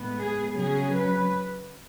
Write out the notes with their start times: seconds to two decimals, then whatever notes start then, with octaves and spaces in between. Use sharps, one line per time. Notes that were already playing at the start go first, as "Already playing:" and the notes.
Already playing: A2 G#3 B3
0.19 G#4
0.56 C#3 F#3 C#4 G#4
0.93 B4